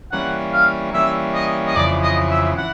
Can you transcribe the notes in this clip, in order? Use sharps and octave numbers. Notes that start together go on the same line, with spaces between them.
E3 G3 A#3 C#4 F#5
F5
E3 G3 A#3 C#4 E5
D#5
D#5
F2 C#3 E3 D5
D#5
E5
E3 F#5